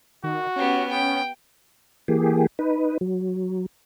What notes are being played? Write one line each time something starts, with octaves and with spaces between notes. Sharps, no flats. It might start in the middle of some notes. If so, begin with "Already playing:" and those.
D#3 F#4
B3 C#4 G4
B3 G5
E3 A#3 G4 G#4
D#4 B4
F#3